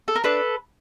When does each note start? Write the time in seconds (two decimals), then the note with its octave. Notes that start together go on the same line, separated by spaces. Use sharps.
0.08 A4
0.16 A#4
0.24 D4 A4 B4